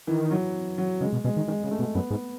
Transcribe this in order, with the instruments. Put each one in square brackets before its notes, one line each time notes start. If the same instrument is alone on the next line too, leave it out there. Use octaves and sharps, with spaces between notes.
[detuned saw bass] D#3 [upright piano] E3
[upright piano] F#3
F#3
[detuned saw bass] C#3 [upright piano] G#3
[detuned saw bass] B2
[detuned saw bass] B2 [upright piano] G#3
[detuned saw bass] D#3
[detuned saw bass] D#3 [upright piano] G#3
[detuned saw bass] C#3
[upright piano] A3
[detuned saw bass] B2
[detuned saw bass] F#2 [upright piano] B3
[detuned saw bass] G#2